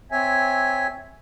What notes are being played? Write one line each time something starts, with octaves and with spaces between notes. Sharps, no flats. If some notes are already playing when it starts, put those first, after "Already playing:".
C4 C#5 E5 G#5